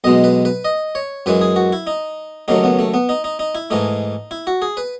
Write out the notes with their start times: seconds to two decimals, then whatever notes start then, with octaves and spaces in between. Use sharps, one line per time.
0.04 B1 B2 G#3 D#5
0.24 B4
0.45 B4
0.65 D#5
0.95 C#5
1.26 F#2 E3 G#3 B4
1.41 G#4
1.56 F#4
1.73 E4
1.87 D#4
2.48 D#2 C#3 F#3 A3 D#4
2.64 B3
2.79 A3
2.94 B3
3.09 D#4
3.24 D#4
3.39 D#4
3.55 E4
3.70 G#2 E3 A3 D#4
4.31 E4
4.47 F#4
4.62 G#4
4.77 B4